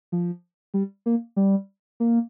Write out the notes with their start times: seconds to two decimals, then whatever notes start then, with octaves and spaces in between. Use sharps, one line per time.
0.12 F3
0.74 G3
1.06 A#3
1.36 G3
2.00 A#3